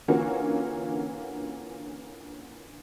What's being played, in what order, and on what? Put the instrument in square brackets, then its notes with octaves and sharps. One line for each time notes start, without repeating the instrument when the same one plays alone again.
[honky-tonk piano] D3 E3 A#3 C#4 F4 F#4